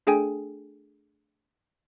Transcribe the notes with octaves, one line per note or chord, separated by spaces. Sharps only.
A3 D4 G#4 A4 G5 G#5